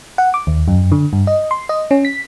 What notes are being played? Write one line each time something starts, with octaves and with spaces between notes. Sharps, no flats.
F#5
D6
D#2
F#2
D3
G2
D#5
C6
D#5
C#4
B6